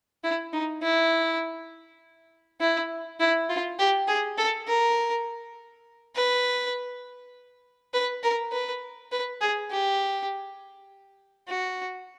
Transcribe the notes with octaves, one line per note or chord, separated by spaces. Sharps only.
E4
D#4
E4
E4
E4
F4
G4
G#4
A4
A#4
B4
B4
A#4
B4
B4
G#4
G4
F#4